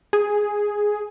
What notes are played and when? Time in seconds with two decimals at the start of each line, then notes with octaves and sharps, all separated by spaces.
0.13 G#4